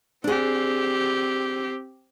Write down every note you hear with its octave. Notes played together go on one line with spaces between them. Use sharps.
C4 D4 G4 G#4